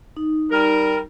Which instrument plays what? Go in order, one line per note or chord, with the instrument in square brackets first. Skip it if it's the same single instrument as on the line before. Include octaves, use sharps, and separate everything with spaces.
[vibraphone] D#4
[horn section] G3 A#4